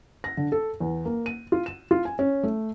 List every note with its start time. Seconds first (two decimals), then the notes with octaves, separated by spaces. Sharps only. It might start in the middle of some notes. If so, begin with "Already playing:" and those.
0.24 A#6
0.37 D3
0.52 A4
0.80 E2
1.05 A#3
1.26 D#7
1.52 F4
1.66 E7
1.91 F4
2.05 G#5
2.19 C#4
2.43 A3